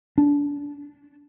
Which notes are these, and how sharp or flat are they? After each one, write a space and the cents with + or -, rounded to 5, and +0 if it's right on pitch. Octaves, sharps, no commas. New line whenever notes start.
D4 -30